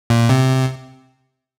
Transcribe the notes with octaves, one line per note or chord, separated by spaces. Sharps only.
A#2
C3